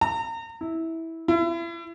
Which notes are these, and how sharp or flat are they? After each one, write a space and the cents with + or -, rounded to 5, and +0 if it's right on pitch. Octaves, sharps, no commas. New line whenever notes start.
A#5 -35
E4 -15
E4 +35